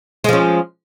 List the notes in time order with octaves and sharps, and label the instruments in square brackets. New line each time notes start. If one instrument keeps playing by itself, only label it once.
[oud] G#3
F3
C#4